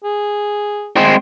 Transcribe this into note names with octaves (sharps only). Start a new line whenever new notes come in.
G#4
G#3 C4